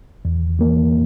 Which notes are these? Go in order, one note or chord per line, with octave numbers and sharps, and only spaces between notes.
E2
E3 A#3